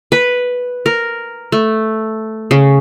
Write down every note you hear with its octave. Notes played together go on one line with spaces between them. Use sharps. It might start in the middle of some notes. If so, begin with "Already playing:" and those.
B4
A#4
A3
C#3